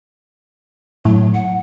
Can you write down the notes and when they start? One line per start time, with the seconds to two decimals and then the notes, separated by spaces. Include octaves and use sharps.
1.05 A2 F#3
1.34 F#5